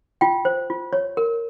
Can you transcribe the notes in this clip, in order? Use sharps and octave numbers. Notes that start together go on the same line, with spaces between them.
F4 G5
C5
F4
C#5
A#4